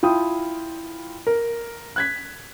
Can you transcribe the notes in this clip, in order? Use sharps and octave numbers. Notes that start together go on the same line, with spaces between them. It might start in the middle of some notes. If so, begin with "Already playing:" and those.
E4 F4 G5 A5 D#6
A#4
F#6 G#6 B6